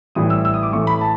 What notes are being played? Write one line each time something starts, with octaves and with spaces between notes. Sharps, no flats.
A2 E3 G3 D#6
E6
E6
D#6
D6
A2 E3 A3 C#6
B5
A5